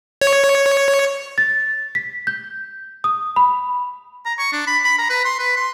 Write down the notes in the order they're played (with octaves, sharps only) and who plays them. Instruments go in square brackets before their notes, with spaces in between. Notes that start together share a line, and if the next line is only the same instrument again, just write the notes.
[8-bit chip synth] C#5
[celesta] A6
B6
G6
D#6
B5
[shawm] A#5
C#6
D4
B5
B5
A#5
B4
C6
B4
C6